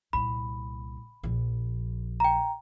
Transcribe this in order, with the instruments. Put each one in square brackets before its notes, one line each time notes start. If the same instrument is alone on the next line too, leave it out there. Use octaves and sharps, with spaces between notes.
[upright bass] C2 A#2 [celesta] B5
[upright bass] A#1 F3
[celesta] G5 A#5